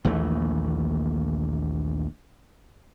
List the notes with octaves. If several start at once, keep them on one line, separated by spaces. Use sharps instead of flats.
A#1 D#2 E3 A3